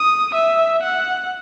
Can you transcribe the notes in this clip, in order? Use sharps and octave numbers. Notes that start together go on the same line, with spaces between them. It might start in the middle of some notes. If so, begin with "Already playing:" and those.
Already playing: D#6
E5
F#5